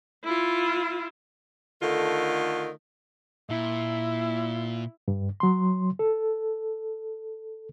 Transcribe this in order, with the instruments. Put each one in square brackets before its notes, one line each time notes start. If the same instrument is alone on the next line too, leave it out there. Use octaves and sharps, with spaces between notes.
[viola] E4 F4
[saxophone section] D3 D#3 A3 F4
[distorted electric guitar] A#2 [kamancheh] E4
[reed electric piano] G2
F#3 C6
A4